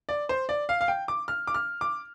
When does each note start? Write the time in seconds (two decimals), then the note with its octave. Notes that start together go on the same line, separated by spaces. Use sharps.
0.09 D5
0.29 C5
0.49 D5
0.69 F5
0.81 F5
0.88 G5
1.08 D6
1.28 F6
1.47 D6
1.54 F6
1.81 D6